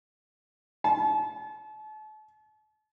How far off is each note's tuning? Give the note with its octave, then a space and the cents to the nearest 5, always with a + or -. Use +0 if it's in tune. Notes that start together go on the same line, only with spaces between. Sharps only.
A5 -40